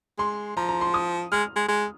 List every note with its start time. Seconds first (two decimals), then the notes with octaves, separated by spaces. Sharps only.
0.18 G#3 C6
0.57 F3 A#5
0.69 A#5
0.81 C6
0.94 D#6
1.32 G#3 F6
1.56 G#3
1.69 G#3